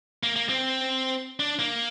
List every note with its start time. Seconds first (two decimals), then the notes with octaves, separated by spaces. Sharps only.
0.23 A#3
0.36 A#3
0.49 C4
1.40 D4
1.59 A#3